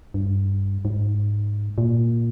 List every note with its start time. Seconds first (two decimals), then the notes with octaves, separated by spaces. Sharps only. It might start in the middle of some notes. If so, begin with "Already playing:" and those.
0.14 G2
0.85 G#2
1.78 A#2